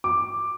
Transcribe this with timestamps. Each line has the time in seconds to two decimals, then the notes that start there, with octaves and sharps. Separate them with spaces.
0.04 D6